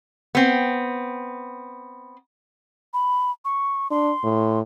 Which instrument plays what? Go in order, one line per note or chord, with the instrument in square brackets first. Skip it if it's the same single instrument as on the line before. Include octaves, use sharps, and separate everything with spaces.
[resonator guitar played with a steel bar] B3 C4
[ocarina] B5
C#6
[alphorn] D4 [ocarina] C6
[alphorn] A2